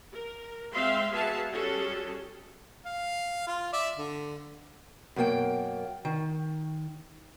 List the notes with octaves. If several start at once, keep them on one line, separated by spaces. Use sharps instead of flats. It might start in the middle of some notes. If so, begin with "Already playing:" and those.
A#4
G#3 C4 E5 F5 C6
B3 F#4 G#4 E5 F5 A5
G3 C#4 F#4 G#4 A4
F5
F4
D5 E5
D3
F#2 B2 A#3 G5
D#3